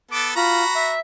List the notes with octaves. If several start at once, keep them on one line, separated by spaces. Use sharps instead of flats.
B3 A4 D6
F4 F#4 A#5 B5
E5